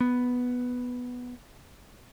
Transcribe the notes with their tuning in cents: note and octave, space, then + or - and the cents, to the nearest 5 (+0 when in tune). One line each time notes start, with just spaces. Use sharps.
B3 +0